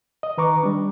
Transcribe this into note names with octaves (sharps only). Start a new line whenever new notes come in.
D#5
D#3 B4 A#5 C#6 D6
G3 D4